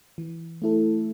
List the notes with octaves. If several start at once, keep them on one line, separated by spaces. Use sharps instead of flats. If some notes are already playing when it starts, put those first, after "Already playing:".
E3
A3 E4 A4